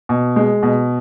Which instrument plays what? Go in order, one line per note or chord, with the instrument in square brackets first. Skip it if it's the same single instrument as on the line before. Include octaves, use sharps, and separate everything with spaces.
[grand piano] B2
G#3
B2